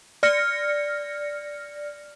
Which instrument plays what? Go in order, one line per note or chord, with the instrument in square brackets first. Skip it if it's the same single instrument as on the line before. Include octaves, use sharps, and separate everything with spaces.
[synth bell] D5 F6 A#6 C#7